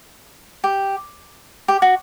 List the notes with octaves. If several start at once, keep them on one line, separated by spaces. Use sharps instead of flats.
G4
G4
F#4